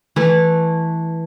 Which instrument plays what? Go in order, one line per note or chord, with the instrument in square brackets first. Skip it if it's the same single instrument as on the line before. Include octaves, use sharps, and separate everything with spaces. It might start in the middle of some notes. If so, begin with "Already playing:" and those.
[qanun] E3 A3 E4